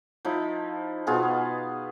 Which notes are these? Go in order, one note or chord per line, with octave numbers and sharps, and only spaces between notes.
F3 D#4 E4
B2 B3 F4 G#4